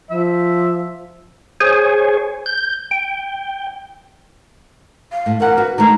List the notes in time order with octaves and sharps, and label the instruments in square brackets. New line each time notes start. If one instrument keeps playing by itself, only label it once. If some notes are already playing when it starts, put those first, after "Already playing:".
[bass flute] F3 [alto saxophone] E5
[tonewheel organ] G#4 C5 C#5 G#5
G6
G5
[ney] F5
[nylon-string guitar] A2
[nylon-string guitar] E2 F#5 [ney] A#4
[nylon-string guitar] F#4 B4
[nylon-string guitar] D#3 A3 [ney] A#5